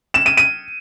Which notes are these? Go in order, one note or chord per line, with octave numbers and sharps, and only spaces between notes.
E7
D#7
D#7